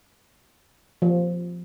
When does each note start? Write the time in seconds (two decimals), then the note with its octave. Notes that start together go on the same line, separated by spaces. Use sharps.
1.02 F3